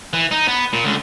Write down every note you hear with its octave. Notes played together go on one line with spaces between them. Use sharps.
E3
D#4
B3
A#2
C#2 D3